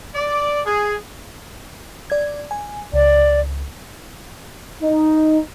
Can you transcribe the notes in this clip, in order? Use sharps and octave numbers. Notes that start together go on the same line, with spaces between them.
D5
G#4
D5 G#6
G#5
C#2 D5
D#4